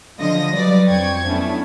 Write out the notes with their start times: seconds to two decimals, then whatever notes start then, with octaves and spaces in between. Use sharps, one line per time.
0.20 D3 F3 F4 D#5 D#6 A#6
0.55 F#3 G3 B4 D5
0.89 F2 C5 G5 C#6 G#6
1.26 A3 B3 C#4 D4 E4